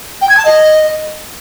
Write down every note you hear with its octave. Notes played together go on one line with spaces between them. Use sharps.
G5
G#6
A5
D#5